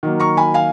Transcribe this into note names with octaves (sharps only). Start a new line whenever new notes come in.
D#3 F#3 A#3
A#5 C#6
G#5 B5
F5 G#5